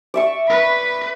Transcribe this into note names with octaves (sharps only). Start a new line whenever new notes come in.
D5 E5 C#6
B4 B5